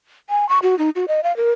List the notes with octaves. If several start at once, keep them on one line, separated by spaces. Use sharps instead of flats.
G#5
C#6
F#4
D#4
F#4
D#5
F5
A#4